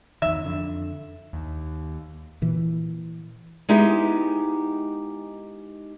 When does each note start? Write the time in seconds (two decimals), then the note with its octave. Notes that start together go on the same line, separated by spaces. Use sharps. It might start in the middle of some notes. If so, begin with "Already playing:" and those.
0.22 E2 D#3 E5
0.44 F2 D3
1.33 D#2
2.42 A#2 E3
3.69 G#3 B3 D#4 E4 G4 G#4